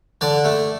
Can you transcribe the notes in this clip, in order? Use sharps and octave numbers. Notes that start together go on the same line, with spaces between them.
D3 D5
A3